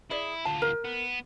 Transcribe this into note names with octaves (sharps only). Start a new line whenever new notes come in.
E4 G#4 D5
D2 F4 A5
A#4
B3